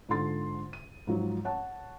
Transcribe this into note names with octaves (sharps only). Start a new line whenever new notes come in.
G#2 D3 F4 A4 C6 A6
D#7
G#2 F3 F#3
C#5 F#5 A5